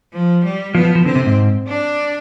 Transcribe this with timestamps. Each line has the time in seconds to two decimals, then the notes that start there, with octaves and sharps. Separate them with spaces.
0.13 F3
0.44 G3
0.74 F3 B3
0.85 F3
0.95 F3
1.05 D3 C4
1.15 C3
1.26 G#2
1.68 D4